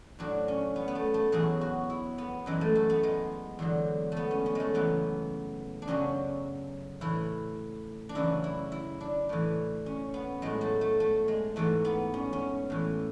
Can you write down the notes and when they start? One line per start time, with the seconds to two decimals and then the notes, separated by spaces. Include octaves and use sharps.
0.19 A2 F#3 D4
0.48 C#4
0.76 B3
0.88 B3
0.95 A3
1.14 A3
1.32 E2 B2 F#3 G#4
1.61 F#4
1.90 E4
2.18 B3
2.46 F#2 E3 G#3
2.61 A3
2.75 A3
2.90 B3
3.03 G#3
3.59 E2 D3 F#3
4.12 A3 B3
4.31 C#4
4.46 C#4
4.55 G#3 A3
4.74 F#2 C#3 E3 B3
5.82 D4
5.88 F#2 C#3 F#3 C#4
7.01 A2 E3 E4
8.09 D4
8.15 F#2 C#3 E3 E4
8.44 E4
8.72 E4
9.01 D4
9.29 A2 E3
9.86 C#4
10.14 B3
10.42 A2 F#3 G#3
10.61 A3
10.81 A3
11.00 A3
11.28 G#3
11.56 G#2 E3 A3
11.85 B3
12.14 C#4
12.33 C#4
12.70 A2 E3